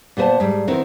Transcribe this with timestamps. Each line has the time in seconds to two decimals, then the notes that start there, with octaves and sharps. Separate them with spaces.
0.17 A#2 B3 A#4 C5 A5
0.40 G#2 G3
0.67 D#3 B3 C4 E4 A#4